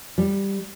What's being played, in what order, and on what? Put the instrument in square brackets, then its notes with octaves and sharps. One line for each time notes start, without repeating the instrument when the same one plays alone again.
[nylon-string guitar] G3